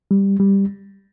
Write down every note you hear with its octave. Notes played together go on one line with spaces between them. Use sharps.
G3
G3